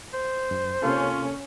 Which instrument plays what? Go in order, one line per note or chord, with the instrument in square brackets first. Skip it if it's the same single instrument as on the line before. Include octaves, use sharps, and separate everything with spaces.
[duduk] C5
[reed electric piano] F#2
[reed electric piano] C3 A#3 A4 [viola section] C#4 [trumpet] F4